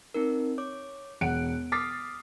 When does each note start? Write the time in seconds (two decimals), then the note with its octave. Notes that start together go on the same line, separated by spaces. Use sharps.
0.14 C4 D#4 A#4
0.58 C#5 D6
1.21 E1 F#5 F#6 D7
1.72 D6 D#6 F6 A6 B6 C7